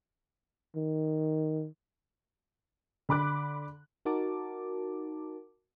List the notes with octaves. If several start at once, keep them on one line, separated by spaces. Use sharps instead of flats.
D#3
D3 B5 D6 F#6
D#4 F#4 A#4 A5 D6